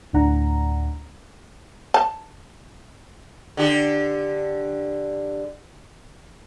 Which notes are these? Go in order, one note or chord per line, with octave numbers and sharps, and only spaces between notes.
D2 A2 D4 F#5 A#5
A5
D3 G4